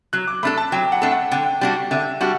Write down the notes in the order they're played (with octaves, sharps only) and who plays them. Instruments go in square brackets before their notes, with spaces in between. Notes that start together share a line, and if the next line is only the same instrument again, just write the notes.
[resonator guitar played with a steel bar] F#3 [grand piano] F#6
[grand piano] D6
[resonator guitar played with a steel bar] A3 D4 A4 [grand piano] B5
[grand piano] A5
[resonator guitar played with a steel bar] F#3 [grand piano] G5
[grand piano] F#5
[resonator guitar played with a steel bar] A3 D4 A4
[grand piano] F#5
[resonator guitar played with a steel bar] D3 [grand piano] G5
[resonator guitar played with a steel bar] G3 D4 F#4
[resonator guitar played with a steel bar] D3 [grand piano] E5
[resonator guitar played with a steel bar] G3 D4 F#4 [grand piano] F#5